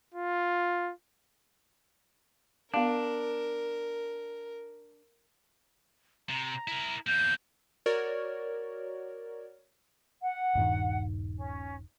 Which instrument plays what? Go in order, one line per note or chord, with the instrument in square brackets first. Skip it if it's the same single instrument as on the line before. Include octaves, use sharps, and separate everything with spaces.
[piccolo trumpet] F4
[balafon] B3 F5 [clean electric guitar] D4 [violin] A#4
[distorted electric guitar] C3 [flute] A#5
[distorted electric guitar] E4 A#4
[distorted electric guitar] E2 A#3 [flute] G6
[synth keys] F#4 A#4 C#5 D5
[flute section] F#5
[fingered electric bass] D#1 G2 D#3
[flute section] C#4